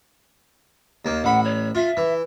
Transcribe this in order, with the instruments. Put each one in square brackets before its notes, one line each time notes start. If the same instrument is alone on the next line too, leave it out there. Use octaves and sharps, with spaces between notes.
[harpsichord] D#2 A#3
[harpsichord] A1 B5 [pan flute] F#5
[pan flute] C#5
[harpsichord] F4 [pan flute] E5
[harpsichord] E3